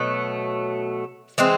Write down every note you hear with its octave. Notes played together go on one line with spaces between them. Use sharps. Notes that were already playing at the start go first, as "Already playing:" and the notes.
Already playing: B2 F#3 A3
E3 G#3 C4